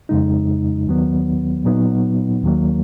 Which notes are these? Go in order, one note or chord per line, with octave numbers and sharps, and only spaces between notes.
F2 C#3 G#3 D#4
D#2 D#3 F#3 B3
A#2 F#3 B3 D#4
D#2 D#3 F#3 A#3